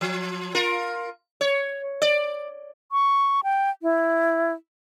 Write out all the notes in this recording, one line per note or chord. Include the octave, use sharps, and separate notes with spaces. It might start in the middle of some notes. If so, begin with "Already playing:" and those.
F3
F4 A#4
C#5
D5
C#6
G5
E4